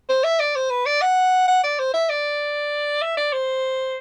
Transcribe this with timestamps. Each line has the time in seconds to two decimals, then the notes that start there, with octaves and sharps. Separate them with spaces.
0.09 C5
0.24 E5
0.40 D5
0.56 C5
0.70 B4
0.86 D5
1.01 F#5
1.48 F#5
1.63 D5
1.79 C5
1.94 E5
2.09 D5
3.02 E5
3.17 D5
3.33 C5